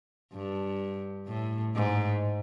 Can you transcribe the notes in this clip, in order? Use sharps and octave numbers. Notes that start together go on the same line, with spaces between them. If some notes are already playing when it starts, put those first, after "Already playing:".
G2
A2
G#2